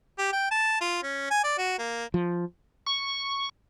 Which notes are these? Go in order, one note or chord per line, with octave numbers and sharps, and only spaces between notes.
G4
G5
A5
F4
C#4
G#5
D5
F#4
A#3
F3
C#6